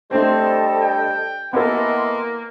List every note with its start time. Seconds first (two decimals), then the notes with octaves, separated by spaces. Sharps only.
0.11 G3 A3 C4 D4 A4 C5 D#5 A5
0.81 G5
1.53 E3 A#3 B3 A4 D#5 C6